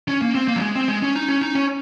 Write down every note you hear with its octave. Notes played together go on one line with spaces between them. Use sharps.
C#4
A#3
C4
A#3
F#3
G#3
C4
G#3
C#4
D#4
C#4
D#4
C#4